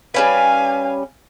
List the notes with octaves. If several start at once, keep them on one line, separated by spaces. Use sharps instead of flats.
G3 C#4 B4 F5 G#5